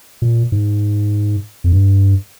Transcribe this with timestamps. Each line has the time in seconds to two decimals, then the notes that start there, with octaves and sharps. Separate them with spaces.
0.22 A#2
0.52 G#2
1.64 F2
1.72 G2